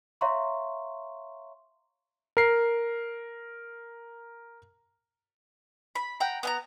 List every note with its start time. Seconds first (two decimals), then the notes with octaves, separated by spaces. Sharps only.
0.21 C#5 E5 F5 A#5 C6 C#6
2.37 A#4 C7
5.95 B5
6.20 F#5 G5 A#5
6.43 B3 G#5 A#5